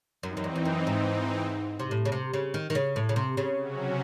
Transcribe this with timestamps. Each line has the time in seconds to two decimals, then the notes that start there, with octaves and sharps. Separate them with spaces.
0.23 F#2 E3 C4 D#4
0.37 F#2
0.44 E2
0.56 E2
0.65 F#2
0.87 G#2
1.80 C3
1.91 A2
2.05 C#3
2.12 C3
2.34 C#3
2.54 D#3
2.70 D#3
2.75 C#3
2.96 A2
3.09 C#3
3.16 C3
3.37 C#3
3.58 C3 F#3 C#4 F#4